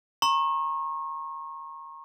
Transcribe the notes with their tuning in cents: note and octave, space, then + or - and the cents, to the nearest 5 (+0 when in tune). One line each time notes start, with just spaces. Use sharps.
A#5 +0 C#6 -35